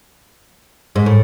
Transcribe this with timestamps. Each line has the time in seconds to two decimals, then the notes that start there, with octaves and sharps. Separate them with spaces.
0.96 G#2
1.06 A2